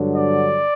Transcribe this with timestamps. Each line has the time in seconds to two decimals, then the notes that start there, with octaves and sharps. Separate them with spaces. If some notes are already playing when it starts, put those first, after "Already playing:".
Already playing: G2 D3 F#3
0.15 D5